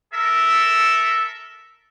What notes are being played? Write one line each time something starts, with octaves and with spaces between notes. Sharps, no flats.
A4 A#4 E5